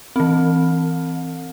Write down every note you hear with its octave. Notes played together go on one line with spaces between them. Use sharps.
E3 C4